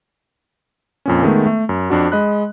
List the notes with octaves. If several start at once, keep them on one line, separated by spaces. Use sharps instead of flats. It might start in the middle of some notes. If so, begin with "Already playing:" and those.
F2 A#2 C#4
D#3 G#3 A3 B3
A3
F#2
F2 D4 F#4
G#3 D#5 B5 F#6